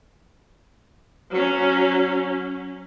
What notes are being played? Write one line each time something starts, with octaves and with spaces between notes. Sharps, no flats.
F#3 C#4